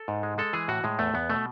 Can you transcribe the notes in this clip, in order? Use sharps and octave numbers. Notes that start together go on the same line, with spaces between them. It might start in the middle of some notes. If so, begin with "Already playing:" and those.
Already playing: A4
G#2
G#3
G#3 A4
E3 G#4
A2 F#4
A2 G#3
E2 A3
E2 B3
B2 A3